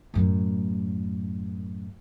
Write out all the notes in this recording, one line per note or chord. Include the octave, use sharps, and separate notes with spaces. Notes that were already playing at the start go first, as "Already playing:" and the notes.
F#2 A2